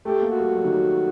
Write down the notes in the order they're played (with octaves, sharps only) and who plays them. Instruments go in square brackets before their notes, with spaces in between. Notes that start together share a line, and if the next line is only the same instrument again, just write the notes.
[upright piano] A3 [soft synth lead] G4
[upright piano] A#3
[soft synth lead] F#4
[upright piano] G3
F#3
D#3
F#3